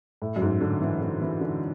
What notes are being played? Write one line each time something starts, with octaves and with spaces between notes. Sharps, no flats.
A2
F#2
G#2
D3
E3
D3
E3
D3